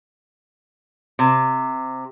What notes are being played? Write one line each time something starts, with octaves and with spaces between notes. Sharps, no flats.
C3